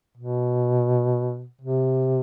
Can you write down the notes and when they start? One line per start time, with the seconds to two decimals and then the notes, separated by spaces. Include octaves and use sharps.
0.17 B2
1.61 C3